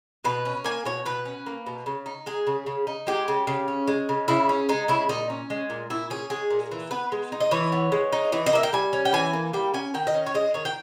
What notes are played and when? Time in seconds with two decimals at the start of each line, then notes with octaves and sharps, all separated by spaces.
0.25 B2 B4
0.45 C#4
0.64 A#3 G#5
0.85 B2 C#5
1.05 B2 B4
1.25 C#4
1.46 A#3
1.66 B2
1.86 C#3
2.06 D#4
2.26 G#3 G#4
2.47 C#3
2.66 C#3
2.87 D#4
3.07 G#3 G4
3.28 C#3
3.47 C#3
3.68 C#4
3.88 G#3
4.09 C#3
4.28 C#3 E4
4.49 C#4
4.69 G#3 D#4
4.88 C#3 E4
5.09 A#2 D#4
5.30 C#4
5.50 G#3
5.70 A#2
5.90 A#2 E4
6.10 C#4 G#4
6.30 G#3 G#4
6.50 A#2
6.71 E3
6.91 B3 B4
7.12 G#3
7.32 D#4
7.41 D#5
7.51 E3 C#5
7.72 B3
7.92 G#3
8.12 D#4
8.32 E3
8.46 D#5
8.53 A#3 E5
8.63 G5
8.73 G3 G#5
8.93 C#4
9.05 G5
9.13 E3 G#5
9.33 A#3
9.53 G3 G5
9.74 C#4 G#5
9.94 D#3 G5
10.07 D#5
10.14 C#4
10.26 C#5
10.34 G#3 D#5
10.54 D#3 C#5
10.65 G5